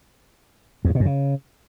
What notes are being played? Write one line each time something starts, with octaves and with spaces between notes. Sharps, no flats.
E2
G2
B2
F#2
C#3